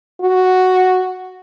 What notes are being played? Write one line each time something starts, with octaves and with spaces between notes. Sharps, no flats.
F#4